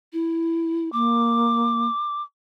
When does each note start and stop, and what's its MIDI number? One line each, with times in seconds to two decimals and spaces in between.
0.13 0.91 64
0.93 1.88 58
0.93 2.22 86